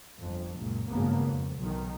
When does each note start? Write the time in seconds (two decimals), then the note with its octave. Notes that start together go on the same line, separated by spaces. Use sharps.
0.20 G1 F2
0.57 C#2 F#2 A#2
0.89 G#1 G2 C#3 A#3 B3
1.28 F2
1.59 B1 D#3